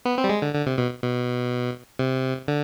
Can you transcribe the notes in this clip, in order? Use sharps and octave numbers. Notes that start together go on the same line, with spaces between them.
B3
C4
G3
G#3
D3
D3
C3
B2
B2
C3
D3